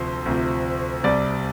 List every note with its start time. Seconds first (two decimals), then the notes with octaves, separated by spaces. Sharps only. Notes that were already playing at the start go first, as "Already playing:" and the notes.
Already playing: D2 C3 F3 C5
0.26 D2 C3 F3
1.03 C2 C3 G3 D5